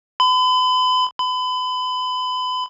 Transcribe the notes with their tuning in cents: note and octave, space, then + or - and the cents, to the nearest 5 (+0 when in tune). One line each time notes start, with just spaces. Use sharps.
B5 +40
B5 +35